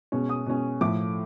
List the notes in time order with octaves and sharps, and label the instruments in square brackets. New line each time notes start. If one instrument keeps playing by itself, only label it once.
[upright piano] B2 G#3 C#4
D#6
B2 G#3 C#4
A2 F3 A3 D6